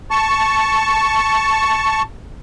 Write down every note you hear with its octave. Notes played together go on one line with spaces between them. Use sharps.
A5 C#6